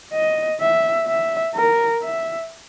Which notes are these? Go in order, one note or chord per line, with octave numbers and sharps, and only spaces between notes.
D#5
E5
E5
A#4
E5